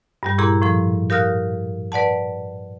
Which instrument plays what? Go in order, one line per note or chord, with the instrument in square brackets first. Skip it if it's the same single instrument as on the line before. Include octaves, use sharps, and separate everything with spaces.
[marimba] G2 G3 G4
A#2 E4 G4 G#4 A#5 C6
A2 F3 C6
G4 A#4 F5 D#6 F6 F#6
B4 D5 F#5 A5